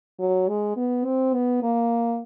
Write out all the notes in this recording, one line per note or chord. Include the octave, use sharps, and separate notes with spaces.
F#3
G#3
B3
C4
B3
A#3